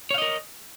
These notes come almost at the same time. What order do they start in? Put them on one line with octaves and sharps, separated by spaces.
C#5 F5 D#5 A#4